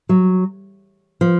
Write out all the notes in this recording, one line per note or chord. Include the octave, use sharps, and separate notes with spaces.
F#3
F3